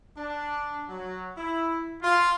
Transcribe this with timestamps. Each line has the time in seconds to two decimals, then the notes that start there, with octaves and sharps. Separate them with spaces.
0.16 D4
0.89 F#3
1.37 E4
2.03 F4